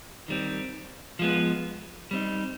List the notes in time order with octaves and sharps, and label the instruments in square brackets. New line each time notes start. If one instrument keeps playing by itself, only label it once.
[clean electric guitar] D#3 G3 C4
F3 G#3 B3
G3 C4 D#4